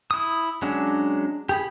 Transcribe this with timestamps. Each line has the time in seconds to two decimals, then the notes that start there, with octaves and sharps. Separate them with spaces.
0.11 E4 D#6
0.62 F#3 G#3 C#4 D4
1.49 G4 G#4 B5